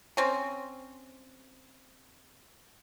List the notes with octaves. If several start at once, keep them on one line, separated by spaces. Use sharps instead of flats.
C4 C#4